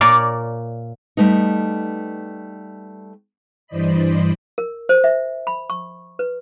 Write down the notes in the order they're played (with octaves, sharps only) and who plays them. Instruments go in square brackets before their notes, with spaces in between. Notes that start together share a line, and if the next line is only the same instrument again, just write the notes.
[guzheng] A#2 A#3 A#4 C#5 D5 F5
[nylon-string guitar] G3 A3 B3 D#4
[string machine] G2 E3 C5 D5 D#5 B5
[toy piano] A#4
C5
E5
B5
C#6
B4